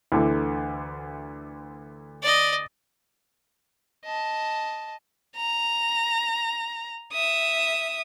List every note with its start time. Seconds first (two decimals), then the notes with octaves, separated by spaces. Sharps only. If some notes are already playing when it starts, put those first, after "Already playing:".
0.12 D2 D3 E3
2.22 D5 D#5
4.05 D#5 A5
5.36 A#5
7.12 E5 D#6